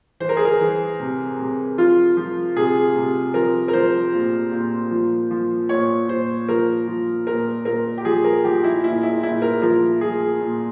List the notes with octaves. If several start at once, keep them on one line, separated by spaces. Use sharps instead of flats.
E3 C5
A#4
G#4
A#4
E3
C3
C3
F3 F4
F3
C3 G#4
C3
F3 A#4
A#4
F3 C5
A#2
A#2
F3
F3
A#2 C#5
A#2 C5
F3 A#4
F3
A#2 A#4
A#2 A#4
G4
F3 G#4
A#4
F3 G4
E4
A#2 E4
E4
A#2 E4
A#4
F3 A#4
F3 G#4
A#2